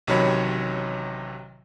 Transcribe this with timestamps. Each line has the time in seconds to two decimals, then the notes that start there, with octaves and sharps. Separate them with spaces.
0.07 A1 C3 D#3 F#3 C#5 B5